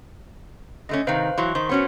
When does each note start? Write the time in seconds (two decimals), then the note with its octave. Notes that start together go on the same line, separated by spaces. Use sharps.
0.89 D3 A3 C#4 D#5
1.07 C3 D#3 B4 C5 F5
1.38 E3 F#3 E4 C6 C#6
1.55 D#3 C5 C6
1.69 B3 C#4 F#4 C#5 F#5